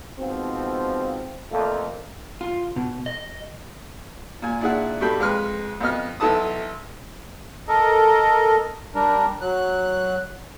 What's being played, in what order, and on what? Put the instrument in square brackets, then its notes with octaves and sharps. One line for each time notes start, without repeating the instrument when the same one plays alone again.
[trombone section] G#2 B2 F3 C4
F2 A#2 F3 A3 A#3
[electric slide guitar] F4
B2
D#5
[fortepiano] A#2 G#5
A#2 D4 E4 G#4 F#5
G2 B2 G4 A4 G5 B5
F2 G#3 B4 F6
F2 B3 D#5 F6
B1 E4 A4 B4 A5 D#6
[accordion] A4 A#4 D#5
G3 D4 A#4
F#3 F#6